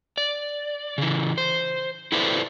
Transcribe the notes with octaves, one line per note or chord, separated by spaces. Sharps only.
D5
C#3 E3
C5
E4 A4 B4 C5 D5 E5